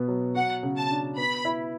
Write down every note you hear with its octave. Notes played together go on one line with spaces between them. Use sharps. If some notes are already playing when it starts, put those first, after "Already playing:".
Already playing: B2 B3
F#3
F#4 F#5
C#3
A5
D4
B3 B5
E4